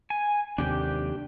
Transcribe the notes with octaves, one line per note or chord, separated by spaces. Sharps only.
G#5
D#2 C3 D4 G4 G5